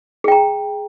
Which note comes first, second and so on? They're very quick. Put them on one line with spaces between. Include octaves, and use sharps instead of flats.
G#4 G5 A#5